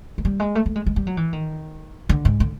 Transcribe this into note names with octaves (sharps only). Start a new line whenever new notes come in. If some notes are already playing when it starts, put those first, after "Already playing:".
G#3
G3
G#3
A3
A3
G#3
G#3
G3
F#3
E3
D#3
D3
G#2
D3